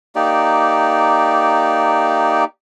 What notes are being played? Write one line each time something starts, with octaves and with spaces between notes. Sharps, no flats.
A#3 D#4 G4 D5